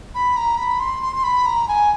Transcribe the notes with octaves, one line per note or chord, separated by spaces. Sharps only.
B5
A#5
B5
C6
C6
C6
B5
A#5
G#5